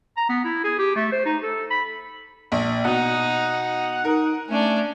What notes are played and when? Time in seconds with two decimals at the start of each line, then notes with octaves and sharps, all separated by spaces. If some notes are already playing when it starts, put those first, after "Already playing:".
0.17 A#5
0.29 B3
0.45 E4
0.64 G#4
0.79 G4
0.96 A3
1.12 C5
1.26 D#4
1.43 A4
1.70 B5
2.52 A#1
2.85 B2 D#4 F#5
4.05 D#4 A#4
4.50 A3 C#4 D4